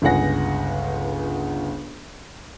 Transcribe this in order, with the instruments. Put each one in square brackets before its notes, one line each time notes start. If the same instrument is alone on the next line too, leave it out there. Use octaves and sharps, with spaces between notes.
[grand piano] G1 C#2 G#4 F#5 A#6